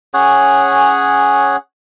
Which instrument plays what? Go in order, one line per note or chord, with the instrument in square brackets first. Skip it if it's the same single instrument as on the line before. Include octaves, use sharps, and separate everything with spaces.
[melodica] C#4 G#4 C#5 F#5